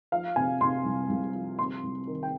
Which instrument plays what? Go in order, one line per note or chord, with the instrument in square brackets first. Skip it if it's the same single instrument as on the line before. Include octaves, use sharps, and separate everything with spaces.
[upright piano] F3 F5
C3 G#5
C3 C6
C2
C2
F3
C3 C6
C2
D#3
G5